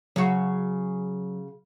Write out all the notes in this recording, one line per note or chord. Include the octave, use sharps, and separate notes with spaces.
C#3 F#3 F#4